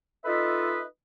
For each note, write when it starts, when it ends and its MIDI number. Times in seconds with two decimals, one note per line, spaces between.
0.25 0.83 63
0.25 0.83 65
0.25 0.83 69
0.25 0.83 71
0.25 0.83 75
0.25 0.83 76